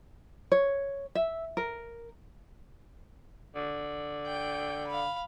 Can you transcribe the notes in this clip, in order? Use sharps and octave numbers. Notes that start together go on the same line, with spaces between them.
C#5
E5
A#4
D3
G5
F5 B5